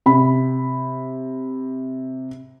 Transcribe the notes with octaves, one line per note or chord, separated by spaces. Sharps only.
C3 B5